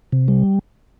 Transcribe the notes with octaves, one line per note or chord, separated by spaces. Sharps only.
C3
G3